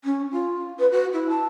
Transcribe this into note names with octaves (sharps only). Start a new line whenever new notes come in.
C#4
F4
B4
F#4
E4
A5